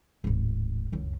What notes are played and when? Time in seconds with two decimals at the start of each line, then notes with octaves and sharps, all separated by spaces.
0.24 D1 G#1
0.92 C#2 F#2